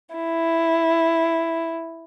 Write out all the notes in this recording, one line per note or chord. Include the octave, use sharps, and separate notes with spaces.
E4